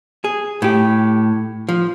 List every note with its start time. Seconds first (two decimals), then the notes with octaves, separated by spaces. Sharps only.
0.24 G#4
0.62 A2 G4
1.69 F3